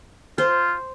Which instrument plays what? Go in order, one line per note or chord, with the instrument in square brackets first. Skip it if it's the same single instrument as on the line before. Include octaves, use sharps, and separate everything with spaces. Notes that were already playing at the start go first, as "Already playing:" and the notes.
[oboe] F4 [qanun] C5